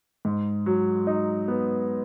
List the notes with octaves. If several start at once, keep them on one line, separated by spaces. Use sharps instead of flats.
G#2
F#3
D#4
B3